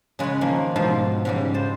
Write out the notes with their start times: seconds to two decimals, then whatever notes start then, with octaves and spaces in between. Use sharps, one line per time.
0.19 C#3 G#3 B4 C#5 B5
0.41 D#3 F3 A#3
0.76 G#2 B2 F3 F4 G4
1.25 G#2 C#3 G3
1.54 C5 A5